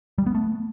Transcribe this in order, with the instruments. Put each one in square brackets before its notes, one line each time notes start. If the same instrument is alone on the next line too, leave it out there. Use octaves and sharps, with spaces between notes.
[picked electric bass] G3
B3
A3